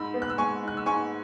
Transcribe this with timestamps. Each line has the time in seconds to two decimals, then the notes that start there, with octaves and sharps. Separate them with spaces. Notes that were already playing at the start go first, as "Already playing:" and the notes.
Already playing: G#2 B5 E6
0.14 B3
0.22 F#6
0.30 E6
0.38 G#3 G#5 C#6
0.63 G#2 F#6
0.77 E6
0.86 G#2 G#5 C#6